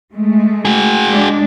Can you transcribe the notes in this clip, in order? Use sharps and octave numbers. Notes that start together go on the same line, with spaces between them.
G#3 A3
F#4 G#4
G#3 D4